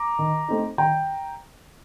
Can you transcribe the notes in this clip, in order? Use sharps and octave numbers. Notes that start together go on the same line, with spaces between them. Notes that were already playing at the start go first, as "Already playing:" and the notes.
Already playing: A#5 D6
D#3
A3 C4 D#4
D#3 G5 A#5